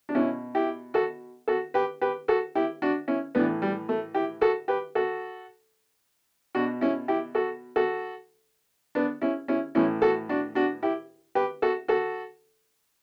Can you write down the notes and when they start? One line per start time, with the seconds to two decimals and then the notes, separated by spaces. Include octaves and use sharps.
0.09 D4
0.15 B2 C#4 E4
0.55 E4 G4
0.94 F#4 A4
1.48 F#4 A4
1.74 G4 B4
2.01 G4 B4
2.28 F#4 A4
2.55 E4 G4
2.82 D4 F#4
3.08 C#4 E4
3.35 A2 E3 B3 D4
3.62 G3
3.89 A3
4.14 E4 G4
4.41 F#4 A4
4.68 G4 B4
4.95 F#4 A4
6.55 B2 D4 F#4
6.81 C#4 E4
7.08 E4 G4
7.35 F#4 A4
7.76 F#4 A4
8.95 B3 D4
9.22 C#4 E4
9.48 C#4 E4
9.75 A2 E3 C#4 E4
10.02 F#4 A4
10.29 D4 F#4
10.55 D4 F#4
10.83 E4 G4
11.35 G4 B4
11.62 F#4 A4
11.88 F#4 A4